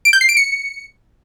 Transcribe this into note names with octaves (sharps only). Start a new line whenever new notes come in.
D7
G6
C7
D7
C#7